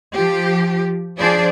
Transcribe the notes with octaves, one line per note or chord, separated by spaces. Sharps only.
F3 G4
F3 D4 G#4 C5 D5